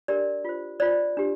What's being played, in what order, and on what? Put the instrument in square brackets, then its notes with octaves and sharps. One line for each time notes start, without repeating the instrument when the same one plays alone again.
[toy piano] D4 G4 A#4 D5
F4 C5
F4 C5 D5
D4 G4